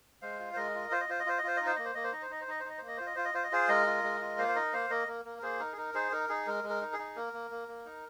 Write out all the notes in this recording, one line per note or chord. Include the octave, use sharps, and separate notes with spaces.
G#3 C5 F5
F4
C5
G#3 A#4 D#5
F4
F4 C5
D#5
F4 C5
D#5
F4 C5
D#5
F4 C5
D#4 D#5
C5
A#3 D#5
C5
A#3 D#5
C5
D#4 D#5
C5
D#4 D#5
C5
D#4 D#5
C5
D#4 D#5
A#3 C5
D#5
F4 C5
D#5
F4 C5
D#5
F4 C5
D#5
F4 G#4 C5
G#3 A#4 D#5
F4
G#3
F4
A#3 C5 F5
C5
D#4 A#4 D#5
A#3 C5 F5
A#3 A#4 D#5
A#3 A#4
A#3 A#4
A#4
A#3 G#4 C5
D#4 A#4
G#4
D#4 A#4
D#4 G#4 C5
D#4 A#4
D#4 G#4
G#3 A#4
G#3
A#4
D#4
G#4
D#4
A#3 A#4
A#3
A#3
A#3
D#4